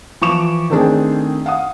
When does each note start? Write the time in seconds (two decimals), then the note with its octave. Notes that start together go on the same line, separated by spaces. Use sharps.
0.21 E3 F3 C#6 D6 E7
0.70 D#3 A3 C4 D4 G#4
1.46 F5 F#5 D#6